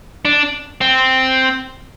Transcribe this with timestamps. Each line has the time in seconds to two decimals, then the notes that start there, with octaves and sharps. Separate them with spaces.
0.25 D4
0.81 C4